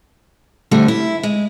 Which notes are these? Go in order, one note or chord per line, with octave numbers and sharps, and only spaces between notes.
D3 G3 A3 C4
E4
G#3